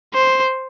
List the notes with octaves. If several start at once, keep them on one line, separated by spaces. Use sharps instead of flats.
C5